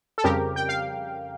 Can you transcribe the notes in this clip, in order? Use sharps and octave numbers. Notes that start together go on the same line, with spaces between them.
A4
F2 C#3 G3 G4 A#4
G5
F5